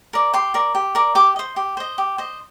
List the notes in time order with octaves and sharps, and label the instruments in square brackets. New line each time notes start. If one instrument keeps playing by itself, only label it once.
[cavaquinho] A#4 D5
G4 C6
A#4 D5
G4
A#4 D5
G4 D6
C5 D#5
G4
C5 D#5
G4
C5 D#5